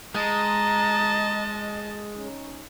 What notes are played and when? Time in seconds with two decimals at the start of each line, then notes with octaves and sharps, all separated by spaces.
0.15 G#3 D#5 A5 A#5
2.15 C#4 D#4